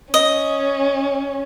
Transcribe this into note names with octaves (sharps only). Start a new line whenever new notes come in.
C#4 D#5